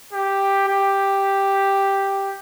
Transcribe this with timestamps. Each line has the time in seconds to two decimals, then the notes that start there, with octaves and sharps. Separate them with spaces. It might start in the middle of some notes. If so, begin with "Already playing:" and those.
0.13 G4
0.68 G4